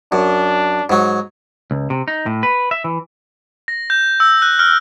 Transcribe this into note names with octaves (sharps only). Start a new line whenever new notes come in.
F#2 D4
G#2 F#3
C#2
C3
D#4
A2
B4
E5
E3
A#6
G6
E6
F#6
F6